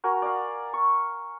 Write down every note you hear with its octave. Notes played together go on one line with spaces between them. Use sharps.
F#4 A#4 G#5
D5 F5
C#6